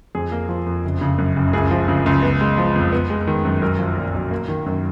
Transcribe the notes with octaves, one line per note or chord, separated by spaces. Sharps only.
F2 G#4
A#3
F3
F2
F#1
C#3
F#2
F#1
C#2 G#4
F3
C#3
C#2
B3
G#3
F3
F2
B3
G#3
D#3
F#2
B1 A#4
F3
A#2
B1
A#3
D#3
F#2